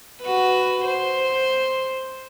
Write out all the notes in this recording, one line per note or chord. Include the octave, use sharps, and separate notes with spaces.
F#4 B4
C5